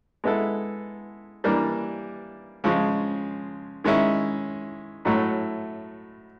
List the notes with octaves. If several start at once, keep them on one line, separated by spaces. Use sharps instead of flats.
G#3 B3 E4 A4
E3 G3 A#3 D4
C#3 F3 G#3
D#3 G#3 C#4 E4
A2 F#3 A3